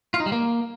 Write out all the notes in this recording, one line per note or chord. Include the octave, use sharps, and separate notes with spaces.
F4
D#4
G3
A#3